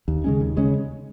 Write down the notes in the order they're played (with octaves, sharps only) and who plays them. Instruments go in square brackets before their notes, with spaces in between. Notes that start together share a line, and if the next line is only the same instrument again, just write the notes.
[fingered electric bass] D#2
C#3 G#3 C#4
D#2
C#3 G#3 C#4